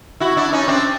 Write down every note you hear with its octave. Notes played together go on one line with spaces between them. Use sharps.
E4 F#4
D4 E4
C#4 D#4
C4 D4